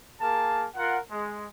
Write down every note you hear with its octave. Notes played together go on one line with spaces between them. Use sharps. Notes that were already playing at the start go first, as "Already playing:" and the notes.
A#3 G#4 A#4 A5
F4 A#4 F#5
G#3